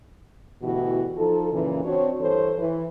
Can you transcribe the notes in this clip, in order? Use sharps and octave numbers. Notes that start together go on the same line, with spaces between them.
D2 B2 E3 E4 F#4 G4
F3 D#4 F4 A4
F#2 A#2 C#3 E3
C4 D4 F#4 C#5
G2 E3 A4 C5 C#5
E3